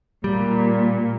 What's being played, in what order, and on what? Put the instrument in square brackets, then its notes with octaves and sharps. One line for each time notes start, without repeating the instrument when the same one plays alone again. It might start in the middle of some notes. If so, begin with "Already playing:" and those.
[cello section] A#2 [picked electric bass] G3